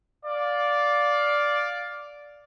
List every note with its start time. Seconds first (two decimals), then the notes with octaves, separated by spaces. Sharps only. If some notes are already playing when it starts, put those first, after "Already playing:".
0.24 D5 F5